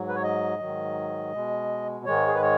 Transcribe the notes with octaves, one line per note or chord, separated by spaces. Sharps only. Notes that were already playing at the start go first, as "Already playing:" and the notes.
Already playing: G#2 F#3
B4
C#5
D#5
G#2 D#3 F#3
B2 G#3
G#2 D#3 G#3 C#5
G#4
B4
C#5